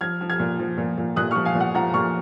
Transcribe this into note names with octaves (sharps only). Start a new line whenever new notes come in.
F3 F6 G#6
F3
F6 G#6
A#2
F3
A#2
A#2
A#2 D#6 F#6
C#6 F6
F3
F5 G#5
A#2
F#5
F3 F#5 A#5
A#2 C#6 F6